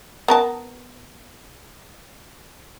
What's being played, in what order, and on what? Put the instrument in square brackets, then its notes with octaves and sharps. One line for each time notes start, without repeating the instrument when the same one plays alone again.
[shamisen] B3 A#4 A5